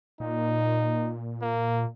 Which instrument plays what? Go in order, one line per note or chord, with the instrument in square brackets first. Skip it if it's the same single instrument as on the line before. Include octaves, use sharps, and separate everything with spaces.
[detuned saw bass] A#2 [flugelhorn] D#4
[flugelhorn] A#3